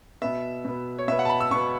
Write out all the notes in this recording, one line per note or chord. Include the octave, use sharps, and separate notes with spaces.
B2 B3 E5
B2 B3
C#5
B2 B3 E5
F#5
A5
B5
E6
B2 B3 C#6